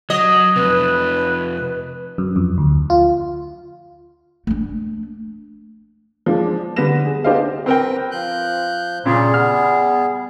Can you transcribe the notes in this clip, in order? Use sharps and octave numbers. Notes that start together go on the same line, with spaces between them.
F#3 D#5
F2 C3 B4
F#2
F2
D2
F4
A3 D4
F3 G#3 D4
D3 G3 B3 B4 A#6 E7
G#4
B3 D4 G4 C5 D#5 F5
C4 A#4 B4 G5
F3 F#6 G6
A#2 C#3 G3 G#4
B3 F6